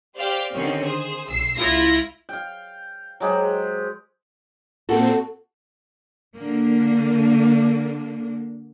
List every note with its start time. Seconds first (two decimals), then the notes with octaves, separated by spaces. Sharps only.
0.16 G4 C5 D5 F5 G5
0.53 D3 D#3 C4 C#4
0.85 G#4 C5
1.27 B1 E6 C7
1.57 C#2 E4 F4 A#6
2.29 F5 G5
3.20 F#3 G#3 G4 C5
4.89 A#2 C4 F#4 A4
6.34 D3 A#3 D4